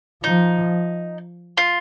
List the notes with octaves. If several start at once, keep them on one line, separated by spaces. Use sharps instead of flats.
F3 D#4
F4